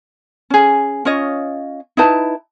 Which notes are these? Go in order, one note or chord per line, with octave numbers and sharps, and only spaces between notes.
C#4 G#4
C#4 F4 C#5 D#5
D#4 E4 B4 A5